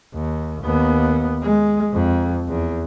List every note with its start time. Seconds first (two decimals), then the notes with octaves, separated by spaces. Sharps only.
0.14 D#2
0.63 D#2 B3
1.43 G#3
1.92 F2
2.48 E2